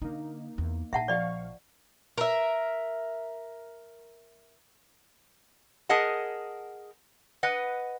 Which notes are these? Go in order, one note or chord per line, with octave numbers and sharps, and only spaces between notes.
D3 A#3 D#4
E2
A#1 E5 F#5 A5
F3 D5 D#5 F5 C#6
A#4 E5
G#4 A#4 D#5 F#5 A5
B4 D#5 F#5